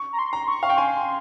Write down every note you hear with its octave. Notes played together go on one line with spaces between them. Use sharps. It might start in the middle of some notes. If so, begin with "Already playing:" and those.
Already playing: C#6
A#5
C6
A#5
C#6
F5
G5
G#5 C6